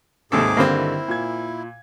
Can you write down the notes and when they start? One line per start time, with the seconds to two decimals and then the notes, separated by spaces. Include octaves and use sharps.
0.32 D#2 G#2 C3 G#4 A4 D6
0.57 G2 D3 D#3 A#3 C4
0.77 E4
1.08 A#2 G#6